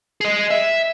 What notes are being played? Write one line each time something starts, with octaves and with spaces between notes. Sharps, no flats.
G#4 D#5
E5